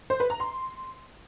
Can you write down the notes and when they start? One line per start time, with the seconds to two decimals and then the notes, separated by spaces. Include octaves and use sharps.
0.10 C5
0.20 B4
0.30 A#5
0.40 C6